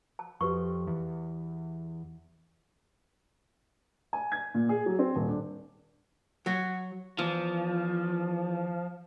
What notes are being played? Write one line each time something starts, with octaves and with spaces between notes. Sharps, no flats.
A5
F2 G4 B4 C#6
E2
G#5
G#6
A#2
G#4
F#3
C4
D#1
D4
F#3 F#4
E2 F3